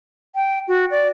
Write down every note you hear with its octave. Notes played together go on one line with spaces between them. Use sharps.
G5
F#4
D5